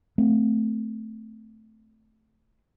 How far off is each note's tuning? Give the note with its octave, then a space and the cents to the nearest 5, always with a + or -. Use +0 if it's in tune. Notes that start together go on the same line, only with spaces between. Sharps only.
A3 +0 C4 -15